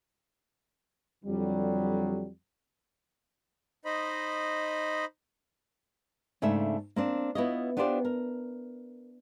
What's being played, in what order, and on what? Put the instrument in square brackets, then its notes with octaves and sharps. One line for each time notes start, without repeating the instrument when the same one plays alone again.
[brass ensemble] F2 D3 F#3 G3
[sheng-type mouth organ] D#4 C5 D#5 B5
[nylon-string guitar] G#2 C#3 A3 D4 E5
A#3 C4 D4
B3 E4 F4 C#5 D#5
B3 D4 F4 G4 C5 D5
A#4